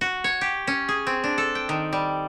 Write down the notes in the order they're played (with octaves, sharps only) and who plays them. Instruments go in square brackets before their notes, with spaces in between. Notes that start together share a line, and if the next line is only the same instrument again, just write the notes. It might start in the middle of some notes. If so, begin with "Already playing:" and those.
[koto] F#4
C#5
G4
C#4
G#4
C4
D4
A4
G5
D#3
G3